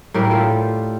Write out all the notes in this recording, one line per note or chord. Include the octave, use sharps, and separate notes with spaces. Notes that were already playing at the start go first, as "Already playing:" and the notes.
A2 G3 G4 A#4
F4 A4